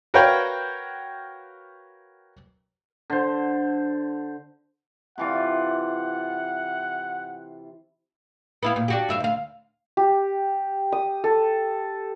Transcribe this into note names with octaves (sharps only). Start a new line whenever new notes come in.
F#4 A#4 B4 C#5 F5 G5
D3 C5
C3 E3 F4 F#5
B3 E4 F5
A#2
D4 F#4 G4
G2 E5 F5
D2 F5
G4
D#6
A4